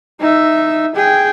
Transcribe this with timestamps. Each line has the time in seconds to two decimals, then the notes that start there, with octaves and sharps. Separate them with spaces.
0.20 D#4 E5
0.96 G#4 G5